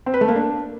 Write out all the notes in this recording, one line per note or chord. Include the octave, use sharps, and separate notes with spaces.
C4
B4
A3
A#3
D4